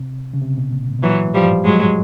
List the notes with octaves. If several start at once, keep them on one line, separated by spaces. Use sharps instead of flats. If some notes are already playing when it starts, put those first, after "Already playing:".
Already playing: C3
C#3
C3
B2
A#2
A2
B2
A#2 E3 F#3
A2
G2 F3 G3
G#2
G2 F#3 G#3